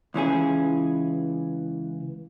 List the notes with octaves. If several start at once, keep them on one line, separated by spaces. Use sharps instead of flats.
C#2 E3 C#4 G#4